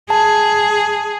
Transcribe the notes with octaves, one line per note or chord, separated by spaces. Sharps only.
G#4 A5